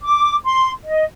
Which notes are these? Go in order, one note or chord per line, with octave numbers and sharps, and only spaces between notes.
D6
C6
D#5